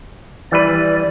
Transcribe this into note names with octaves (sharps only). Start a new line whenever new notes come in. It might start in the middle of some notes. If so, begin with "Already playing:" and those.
E3 G3 B4 D5